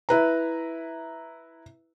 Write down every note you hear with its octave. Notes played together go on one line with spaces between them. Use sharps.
E4 B4 A#5